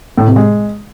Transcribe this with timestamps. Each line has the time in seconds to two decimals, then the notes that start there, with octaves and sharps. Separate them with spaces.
0.18 A2
0.27 C3
0.36 G#3